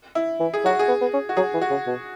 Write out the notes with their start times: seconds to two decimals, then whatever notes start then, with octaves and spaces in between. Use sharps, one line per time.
0.15 E4
0.40 E3
0.54 G#4
0.64 F#3 F#4
0.79 G#4
0.88 B3
1.01 B3
1.13 C#4
1.29 F#4
1.37 F#3 G#4
1.54 E3
1.61 F#4
1.70 C#3
1.86 B2